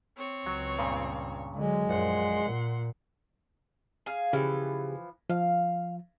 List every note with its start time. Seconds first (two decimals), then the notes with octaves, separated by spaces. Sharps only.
0.17 C4 C#5
0.46 C#2 F#3
0.79 G2 A#2 C#3
1.56 D3 F#3 G#3
1.89 A#1 F#2 F#5 C6
2.44 A#2
4.06 G#4 F5
4.33 C#3 E3 F3 G4 G#4
5.30 F3 F5